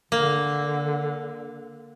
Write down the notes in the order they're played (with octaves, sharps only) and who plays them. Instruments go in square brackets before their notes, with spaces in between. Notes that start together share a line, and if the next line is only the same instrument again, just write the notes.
[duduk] D3 [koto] A#3